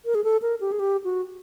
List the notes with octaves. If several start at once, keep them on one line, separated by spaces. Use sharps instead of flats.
A#4
G#4
A4
A#4
G4
G#4
G4
F#4